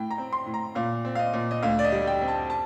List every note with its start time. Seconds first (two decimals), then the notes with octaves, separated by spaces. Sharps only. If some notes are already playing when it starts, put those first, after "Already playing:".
Already playing: A2 G5
0.11 A#5
0.18 C4
0.33 C6
0.46 A2
0.54 A#5
0.75 A#2 F5
1.05 C4
1.15 F5
1.19 D#5
1.33 A#2
1.51 D#5
1.63 D2 F5
1.79 D5
1.84 D#5
1.92 G3
2.07 G5
2.21 C4
2.28 A5
2.50 A5